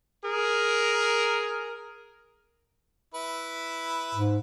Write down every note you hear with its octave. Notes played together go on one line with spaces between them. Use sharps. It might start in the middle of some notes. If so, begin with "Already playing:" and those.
G#4 A#4
E4 B4
G#2